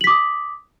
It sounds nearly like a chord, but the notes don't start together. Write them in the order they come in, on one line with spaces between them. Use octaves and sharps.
F#7 B6 D6 D#6